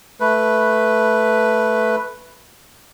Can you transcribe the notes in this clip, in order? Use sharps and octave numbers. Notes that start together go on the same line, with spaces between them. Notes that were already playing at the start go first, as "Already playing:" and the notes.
A3 B4